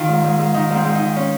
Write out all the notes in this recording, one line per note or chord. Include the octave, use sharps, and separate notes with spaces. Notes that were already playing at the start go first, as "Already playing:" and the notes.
Already playing: D#3 F4
G#2
G#2
G#2
D#3 D#4
G#2 C4
G#2
D#4
D#3
C#4